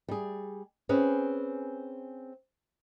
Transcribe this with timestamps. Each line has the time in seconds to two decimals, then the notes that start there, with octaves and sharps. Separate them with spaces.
0.08 G3 G#4
0.89 C4 C#4 G#4 B4